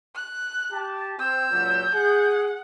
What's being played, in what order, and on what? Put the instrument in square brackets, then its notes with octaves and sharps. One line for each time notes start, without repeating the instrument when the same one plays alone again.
[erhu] F#6
[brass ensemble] G4 A5
[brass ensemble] C4 [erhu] E6 [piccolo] G6
[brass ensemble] C#2 A#2 F#3
[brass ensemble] G#4 [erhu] F#5